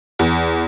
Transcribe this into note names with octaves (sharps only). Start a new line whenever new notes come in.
E2